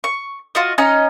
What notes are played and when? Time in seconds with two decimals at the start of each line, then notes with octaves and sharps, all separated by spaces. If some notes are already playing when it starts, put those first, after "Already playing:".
0.04 C#6
0.55 F4 F#4 D#5
0.78 C#4 D#4 D#5 F#5